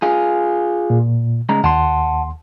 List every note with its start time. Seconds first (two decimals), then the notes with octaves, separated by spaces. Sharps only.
0.02 F4 G#4
0.90 A#2
1.49 C#3 G#3 A#5
1.64 D#2 F#5 A5 C6